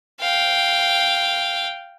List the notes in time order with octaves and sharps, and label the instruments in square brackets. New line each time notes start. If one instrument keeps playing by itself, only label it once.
[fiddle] F5 G5